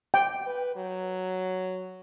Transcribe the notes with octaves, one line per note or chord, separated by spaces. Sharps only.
G5
B4
F#3